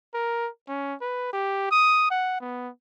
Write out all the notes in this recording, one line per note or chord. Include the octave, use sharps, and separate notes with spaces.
A#4
C#4
B4
G4
D#6
F#5
B3